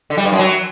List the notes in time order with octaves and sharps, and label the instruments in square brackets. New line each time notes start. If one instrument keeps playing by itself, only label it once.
[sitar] D3
G3
G2
F#2
F#3